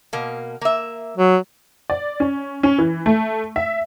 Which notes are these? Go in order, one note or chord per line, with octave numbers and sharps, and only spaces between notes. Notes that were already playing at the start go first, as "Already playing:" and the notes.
B2 A#3
A#3 E5
F#3
D5
C#4
C#4
E3
A3
E5